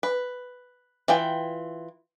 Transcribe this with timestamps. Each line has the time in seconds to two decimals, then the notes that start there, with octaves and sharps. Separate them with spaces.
0.03 B4
1.08 E3 F4 G5